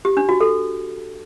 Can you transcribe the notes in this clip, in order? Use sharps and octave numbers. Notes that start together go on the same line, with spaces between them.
G4
D4
F#4
A4